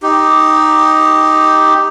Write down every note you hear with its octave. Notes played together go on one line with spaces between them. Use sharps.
D#4 G4